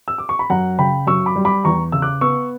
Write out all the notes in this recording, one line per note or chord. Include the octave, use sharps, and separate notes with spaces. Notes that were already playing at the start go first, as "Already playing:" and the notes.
E6
D6
C#6
B5
F#2 F#5 A#5
C#3 G5 B5
F#2 C#6 E6
B5 D6
G3
B5 D6
E2 A#5 C#6
C#3 E6
D6 F#6
B3 C#6 E6